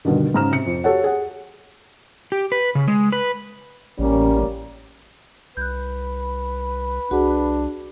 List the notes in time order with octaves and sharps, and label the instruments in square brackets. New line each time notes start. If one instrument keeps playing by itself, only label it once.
[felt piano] G2 B2 D3 D#3
G#2 C#3 A#5 F6 E7
C3 C#7
F2
F#4 G4 A4 C#5 F#5
G#4 F#5
[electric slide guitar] G4
B4
C#3
G#3
B4
[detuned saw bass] A1 [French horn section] G3 A#3 C#4
[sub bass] C2 [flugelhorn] B4 [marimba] F#6 G6
[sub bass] C2 [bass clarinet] D4 [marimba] F#4 G#4 F#5